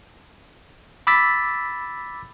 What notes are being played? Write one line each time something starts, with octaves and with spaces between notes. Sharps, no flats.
B5 D6 E6 A6 B6